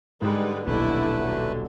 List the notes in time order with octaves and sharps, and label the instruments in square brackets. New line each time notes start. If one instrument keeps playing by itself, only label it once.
[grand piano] G#2 [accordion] D3 [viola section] G3 G#3 B4
[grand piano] D#1 B1 [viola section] D3 D4 E4 [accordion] A3 B4
[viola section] D3 F#3